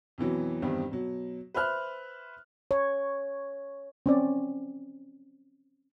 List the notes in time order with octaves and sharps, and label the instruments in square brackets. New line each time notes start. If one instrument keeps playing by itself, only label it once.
[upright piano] F2 B2 E3 F#3
E2 G2 D#3 G3 C4
B2 F#3
B4 C5 E5 F6 F#6
[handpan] C#5
[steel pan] C4 C#4 D5